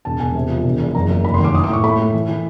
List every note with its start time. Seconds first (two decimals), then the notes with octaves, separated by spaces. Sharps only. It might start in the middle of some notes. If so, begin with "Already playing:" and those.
0.05 E1 A5
0.20 E1 G#5
0.34 C3
0.49 F3
0.64 E1
0.79 E2
0.95 F#1 A#5
1.09 F#1
1.24 F1 B5
1.34 C6
1.39 D#2
1.45 D6
1.53 E4 D#6
1.64 D6
1.68 A2 C#6
1.83 A3 B5
1.99 A3
2.13 E3
2.29 E3